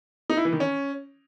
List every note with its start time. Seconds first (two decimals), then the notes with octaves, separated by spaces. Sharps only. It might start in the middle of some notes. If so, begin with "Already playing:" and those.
0.30 D#4
0.37 E4
0.45 E3
0.53 D#3
0.60 C#4